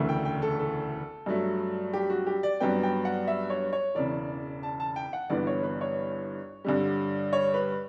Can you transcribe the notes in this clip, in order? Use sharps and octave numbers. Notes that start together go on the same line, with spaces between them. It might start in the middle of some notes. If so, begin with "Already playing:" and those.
Already playing: E1 D2 C#3 E3 A3
G5
G5
A4
A4
G2 F#3 A3
G4
F#4
G4
D5
G2 F#3 B3 G5
G5
F#5
E5
C#5
C#5
E1 E2 C#3 D5
A5
A5
G5
F#5
G1 G2 E3 B3 D5
C#5
B4
C#5
G2 D3 G3
C#5
B4